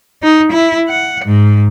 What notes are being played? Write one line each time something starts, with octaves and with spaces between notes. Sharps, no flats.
D#4
E4
F#5
G#2